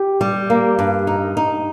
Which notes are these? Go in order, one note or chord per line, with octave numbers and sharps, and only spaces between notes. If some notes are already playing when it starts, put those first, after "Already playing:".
Already playing: G4
G3
A#3
G2
D#4
D#4